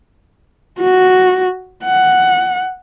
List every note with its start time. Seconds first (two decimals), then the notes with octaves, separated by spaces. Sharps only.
0.81 F#4
1.84 F#5